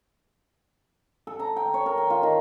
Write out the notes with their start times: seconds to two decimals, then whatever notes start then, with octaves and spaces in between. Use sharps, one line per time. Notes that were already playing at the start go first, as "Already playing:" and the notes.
1.27 A4
1.39 A#5
1.56 G5
1.74 C#5
1.86 A#4
1.98 G5
2.10 F4
2.23 D#3